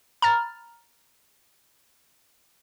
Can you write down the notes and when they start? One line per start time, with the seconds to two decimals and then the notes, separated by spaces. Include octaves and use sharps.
0.22 A#5 B5 F6 A6